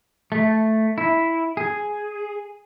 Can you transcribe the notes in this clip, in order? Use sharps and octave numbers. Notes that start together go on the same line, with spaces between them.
A3
E4
G#4